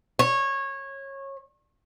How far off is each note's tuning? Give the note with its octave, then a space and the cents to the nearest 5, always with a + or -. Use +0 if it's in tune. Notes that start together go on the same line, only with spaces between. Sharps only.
C#5 -20